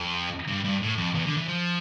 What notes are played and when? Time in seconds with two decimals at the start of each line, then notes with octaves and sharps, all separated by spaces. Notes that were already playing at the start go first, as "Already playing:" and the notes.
Already playing: F2
0.48 G2
0.65 G2
0.82 A2
0.98 F2
1.14 E2
1.26 D3
1.37 E3
1.48 F3